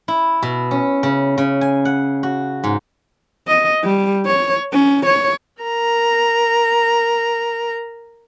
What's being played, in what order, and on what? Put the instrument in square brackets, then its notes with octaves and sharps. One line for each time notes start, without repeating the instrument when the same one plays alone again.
[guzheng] E4
B2
C#4
C#3
C#3
G#5
F#5
F#4
G#2
[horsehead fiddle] D#5
G3
C#5
C#4
C#5
[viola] A#4 A#5